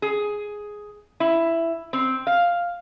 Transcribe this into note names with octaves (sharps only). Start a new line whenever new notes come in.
G#4
E4
C4
F5